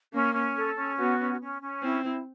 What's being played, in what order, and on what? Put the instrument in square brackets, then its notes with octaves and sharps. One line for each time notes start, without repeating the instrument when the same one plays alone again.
[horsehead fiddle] A#3 [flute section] C#4
[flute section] C#4
A4
C#4
[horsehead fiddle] B3 [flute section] F#4
[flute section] C#4
C#4
C#4
[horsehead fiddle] C4 [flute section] E4
[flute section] E4